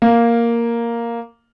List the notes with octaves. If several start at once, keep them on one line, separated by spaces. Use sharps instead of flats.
A#3